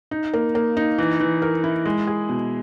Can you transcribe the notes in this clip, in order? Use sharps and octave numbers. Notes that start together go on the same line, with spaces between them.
D#4
A#3
A#3
D#4
E3
E3
A#4
E4
G#3
G#4
B2